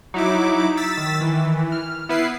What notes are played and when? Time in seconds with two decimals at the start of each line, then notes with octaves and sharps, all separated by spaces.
0.14 F#3 D#4 E4 D6
0.77 E6 A6 B6
0.97 D#3
1.21 E3
1.72 F6
2.09 B3 E4 B4 C7